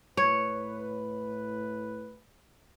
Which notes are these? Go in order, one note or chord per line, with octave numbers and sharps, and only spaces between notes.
A2 B4 C#5